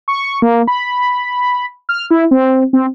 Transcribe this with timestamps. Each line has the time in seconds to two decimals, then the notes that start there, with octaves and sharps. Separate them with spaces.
0.08 C#6
0.42 A#3
0.67 B5
1.89 F6
2.11 E4
2.31 C4
2.73 C4